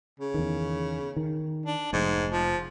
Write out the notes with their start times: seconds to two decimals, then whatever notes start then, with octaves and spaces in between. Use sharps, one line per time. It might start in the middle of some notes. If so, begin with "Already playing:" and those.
0.20 C#3
0.34 E2 D#3
1.16 D#3
1.66 D4
1.93 F1 G#2
2.32 F3